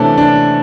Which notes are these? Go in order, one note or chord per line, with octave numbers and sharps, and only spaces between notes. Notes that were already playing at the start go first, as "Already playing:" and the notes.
Already playing: C3 E3 A3 C#4 D4
D4